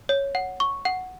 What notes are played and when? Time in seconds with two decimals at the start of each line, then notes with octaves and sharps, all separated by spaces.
0.09 C#5
0.35 F#5
0.60 C#6
0.85 F#5